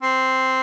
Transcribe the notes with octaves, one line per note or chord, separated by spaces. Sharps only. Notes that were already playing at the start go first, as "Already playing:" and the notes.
C4